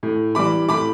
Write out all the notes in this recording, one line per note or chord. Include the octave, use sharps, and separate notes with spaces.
A2
E3 G3 B5 D6
A2 B5 D6